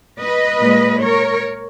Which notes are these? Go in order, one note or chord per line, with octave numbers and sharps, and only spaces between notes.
B4 D#5
A#2 G#3
A#4 C#5